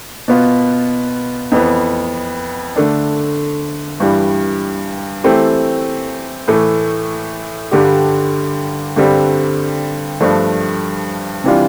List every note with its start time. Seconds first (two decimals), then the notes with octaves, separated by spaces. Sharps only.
0.28 B2 B3 F4
1.52 F2 E3 B3
2.76 D3 A3 D4
4.00 G2 E3 G3
5.24 E3 A3 C4 G4
6.48 A2 E3 A3
7.71 G2 D3 G3 D4 G4
8.96 G2 D3 G3 C4
10.20 G2 F3 A3 D4
11.44 C3 E3 G3 D4 F4